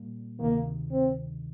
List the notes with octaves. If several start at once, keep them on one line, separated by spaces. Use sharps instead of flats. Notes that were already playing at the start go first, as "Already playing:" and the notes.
Already playing: A#2 G3 A#3
D2 C3 D#3 A#3
C4